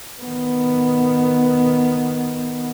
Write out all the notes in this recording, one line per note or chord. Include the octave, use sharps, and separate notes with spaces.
D#3 B3